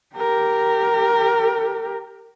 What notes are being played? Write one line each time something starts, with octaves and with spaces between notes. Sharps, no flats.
G4 A#4